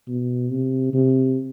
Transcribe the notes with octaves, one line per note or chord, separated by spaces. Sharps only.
B2
C3
C3